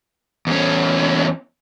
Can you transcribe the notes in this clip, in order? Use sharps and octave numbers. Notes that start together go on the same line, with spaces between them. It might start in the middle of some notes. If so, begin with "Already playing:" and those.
E2 C#4